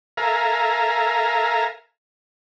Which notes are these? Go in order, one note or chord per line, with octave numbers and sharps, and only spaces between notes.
A4 A#4 E5 F5 G#5 A#5